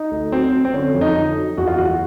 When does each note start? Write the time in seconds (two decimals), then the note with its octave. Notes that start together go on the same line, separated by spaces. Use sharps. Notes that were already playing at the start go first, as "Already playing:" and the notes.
Already playing: D#4
0.11 D2
0.32 F#3 C4
0.53 F#3
0.65 C4
0.73 D3 C#4
0.94 F2
1.01 D#4
1.16 D3
1.37 F#3
1.57 E2 F#4
1.68 F4
1.77 E2 F#4